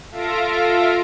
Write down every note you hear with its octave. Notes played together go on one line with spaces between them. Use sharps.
F4 A4 E5 F5 A#6 D7